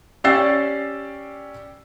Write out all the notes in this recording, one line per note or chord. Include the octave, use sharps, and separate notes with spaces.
C#4 G4 D5 E6 A6 C7